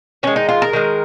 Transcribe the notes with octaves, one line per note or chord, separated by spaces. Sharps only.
D#3 G#3 C#4
D#4
F4
A#4
D#3 G#3